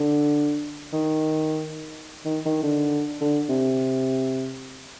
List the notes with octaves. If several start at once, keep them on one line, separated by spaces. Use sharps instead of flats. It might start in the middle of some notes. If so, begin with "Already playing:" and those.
Already playing: D3
D#3
D#3
D#3
D3
D3
C3